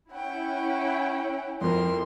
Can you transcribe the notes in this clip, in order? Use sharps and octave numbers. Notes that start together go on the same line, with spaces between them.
C#4 E4 F#5 G5
F2 F3 E4 A#4 C6